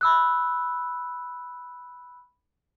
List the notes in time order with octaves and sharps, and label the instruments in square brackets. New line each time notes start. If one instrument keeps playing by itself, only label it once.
[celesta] B5 E6 F#6